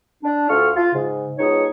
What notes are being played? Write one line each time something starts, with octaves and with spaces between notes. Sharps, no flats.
D4
D2 F4 A4 C#6 F6
F4
G#2 C#3
C#2 B2 D#4 G#4 C#5